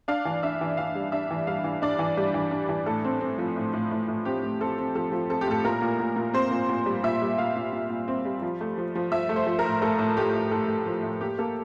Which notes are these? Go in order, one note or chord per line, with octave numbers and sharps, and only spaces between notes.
D4 F5
E3
D4 E5
E3
E3 F5
G3
D4 E5
E3
G3 F5
E3
D4 D5
E3
G3
E3
D4
E3
A2 A4
C4
C4
F3
A2
A2
A2
A2
C4 G4
A2
C4 A4
C4
F3 A4
F3
C4 A4
G4
A2 A4
A#2 A#4
A#2
A#2
A#2
C4 C5
A#2
A#2
G3
A#2 E5
G3
A#2 F5
A#2
A#2
A#2
C4
G3
F3
A3
F3
F3
F3 E5
A3
C5
F3
A#4
A2
A2 A4
A2
A3 G4
A2
A2 A4
A3
F3
A2
A#3 G4
A#3 A4